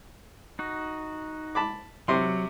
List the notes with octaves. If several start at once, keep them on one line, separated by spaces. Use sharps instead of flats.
D#4 F#4
A5 B5 D6
C3 F#3 C6